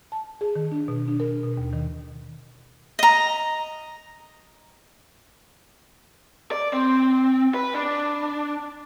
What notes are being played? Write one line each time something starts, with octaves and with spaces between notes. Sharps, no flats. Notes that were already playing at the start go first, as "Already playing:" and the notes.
A5
G#4
D#3
D4
B2
D4
A#4
B2
D#2
D#3
D#5 A#5
D5
C4
B4
D4